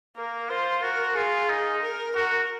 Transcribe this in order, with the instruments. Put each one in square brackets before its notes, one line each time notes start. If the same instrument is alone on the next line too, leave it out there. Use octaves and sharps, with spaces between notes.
[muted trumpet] A#3 [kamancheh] A#4
[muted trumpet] F4 [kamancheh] C5
[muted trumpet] F#4 [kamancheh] A#4
[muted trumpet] F4 [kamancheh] G#4
[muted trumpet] D#4
[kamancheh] A#4
[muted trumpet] F#4 [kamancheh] A#4